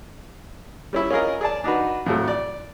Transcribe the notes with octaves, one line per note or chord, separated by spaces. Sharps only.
G3 C#4 E4
C#4 F4 G#4 A#4 D#5
G#4 D5 A5
D4 D#4 F#4 B4
F2 A2 F#3
D5